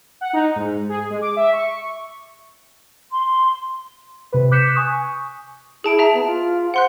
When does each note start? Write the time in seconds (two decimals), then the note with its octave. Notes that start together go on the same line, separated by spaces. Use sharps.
0.21 F#5
0.33 D#4
0.56 G#2
0.89 G#4
1.10 G#3
1.22 D6
1.36 E5
1.53 C#6
3.11 C6
4.32 C3 B4
4.51 D6 F#6 G6 B6 C#7 E7
4.75 G#5 C#6 D#6
5.84 E4 G#4 A5 D7
5.99 G#4 E5 A5 A#5
6.14 B3
6.26 F4
6.74 C5 F#5 C6 F#6